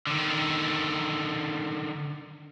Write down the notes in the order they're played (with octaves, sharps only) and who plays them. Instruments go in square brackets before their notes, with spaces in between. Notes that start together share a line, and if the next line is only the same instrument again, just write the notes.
[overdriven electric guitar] D3 D#3